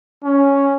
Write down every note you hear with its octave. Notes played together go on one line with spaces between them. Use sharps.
C#4